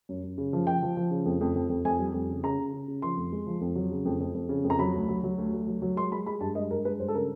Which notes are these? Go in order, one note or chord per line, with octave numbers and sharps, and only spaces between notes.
F#2
F#2
C#3
F3
F3 G5
F3
F3
C#3
F2
F2
F2
F2
F2 G#5
G3
F2
C#3
C#3 A#5
C#3
C#3
C#3
F3 C6
F2
G#3
F3
F2
F#3
C#3
F2
F2
F2
C#3
F2
A#5
F#3 B5
D2
F#3
F#3
D2
D2
F#3
F#3
G#3 C6
G#3 B5
G#3 B5
G2 A5
G#3 D#5
G2 A#4
G#3 B4
G2 C5
A4
C#3 A#4